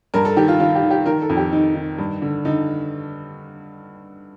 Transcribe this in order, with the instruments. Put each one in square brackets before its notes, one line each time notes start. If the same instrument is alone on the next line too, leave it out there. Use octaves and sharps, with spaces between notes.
[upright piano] G2 A#4
A4
D#3 G4
F4
D#3 F4
G4
D#3
G4
D#3 A#4
A4
F2
G4
D#3 D#4
D#3
G2
D3
D3 D#4